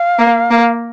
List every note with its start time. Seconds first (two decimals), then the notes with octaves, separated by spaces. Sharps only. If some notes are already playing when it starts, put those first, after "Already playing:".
Already playing: F5
0.19 A#3
0.51 A#3